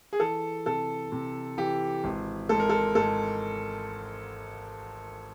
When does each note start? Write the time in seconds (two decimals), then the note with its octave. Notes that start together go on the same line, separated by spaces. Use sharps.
0.13 G#4
0.20 E3 A4
0.66 C3 A4
1.12 C3
1.58 E3 G4
2.04 G#1
2.49 G#2 A4
2.60 A#4
2.70 A4
2.95 G#2 A4